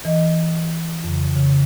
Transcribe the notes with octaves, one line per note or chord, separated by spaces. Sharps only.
E3 D#5
F2 C#3
C#3